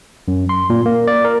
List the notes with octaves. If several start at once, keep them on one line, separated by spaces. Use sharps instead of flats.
F#2
C6
A#2
A#3
D5
A#4